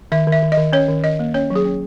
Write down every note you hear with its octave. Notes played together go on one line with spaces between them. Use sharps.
D#3 E5
D#3
E5
D#3
D#5
D#3
C#4 C#5
D#3
D#3 D#5
A#3
C#4 C#5
F#3
G#4
C#4